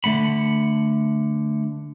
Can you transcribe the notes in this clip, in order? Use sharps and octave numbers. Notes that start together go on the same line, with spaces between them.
D3 A3 F#5 B5